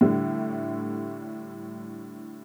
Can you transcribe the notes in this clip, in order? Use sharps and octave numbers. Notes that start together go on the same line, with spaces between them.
A2 D3 G3 A3